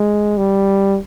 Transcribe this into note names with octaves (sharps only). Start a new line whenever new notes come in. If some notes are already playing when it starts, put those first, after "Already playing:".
Already playing: G#3
G3